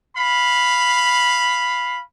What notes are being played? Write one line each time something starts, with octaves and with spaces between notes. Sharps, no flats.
F5 B5